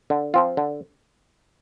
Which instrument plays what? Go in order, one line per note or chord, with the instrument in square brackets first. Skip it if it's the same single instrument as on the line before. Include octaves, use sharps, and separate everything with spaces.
[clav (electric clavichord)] D3
F3 C4 F4
D3